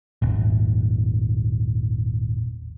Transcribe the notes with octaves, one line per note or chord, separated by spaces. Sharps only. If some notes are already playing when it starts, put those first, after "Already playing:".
D#1 G#1